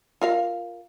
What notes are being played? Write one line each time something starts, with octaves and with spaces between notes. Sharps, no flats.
F4 A#4 F5